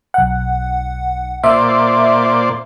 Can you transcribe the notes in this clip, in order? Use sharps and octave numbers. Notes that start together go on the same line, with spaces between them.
B1 F#5
A#2 C5 D5 E5